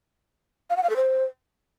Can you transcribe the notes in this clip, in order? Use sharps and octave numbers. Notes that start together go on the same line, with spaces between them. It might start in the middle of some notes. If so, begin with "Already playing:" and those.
F5
F#5
F5
A4
C5